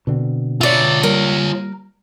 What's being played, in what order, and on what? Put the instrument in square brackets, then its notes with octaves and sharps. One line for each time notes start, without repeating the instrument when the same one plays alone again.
[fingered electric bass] B2 D3 C4
[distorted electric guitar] F4 C#5 [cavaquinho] D5 E5
[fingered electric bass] G3 A#3 [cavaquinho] A#4